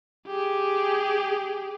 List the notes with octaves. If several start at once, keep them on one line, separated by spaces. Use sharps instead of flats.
G4 G#4